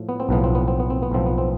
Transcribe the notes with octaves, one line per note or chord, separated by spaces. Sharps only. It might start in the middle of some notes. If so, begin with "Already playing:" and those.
Already playing: A2 F3
B3
C4
B1 A2 F3 B3
C4
B3
C4
B3
C4
B3
B1 A2 F3 C4
B3
C4